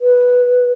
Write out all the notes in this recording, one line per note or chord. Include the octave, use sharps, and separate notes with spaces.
B4